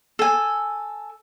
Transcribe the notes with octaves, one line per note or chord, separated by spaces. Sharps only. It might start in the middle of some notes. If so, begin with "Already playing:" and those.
A4 G#5